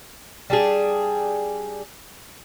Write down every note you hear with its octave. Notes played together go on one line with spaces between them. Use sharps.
G3 D4 G#4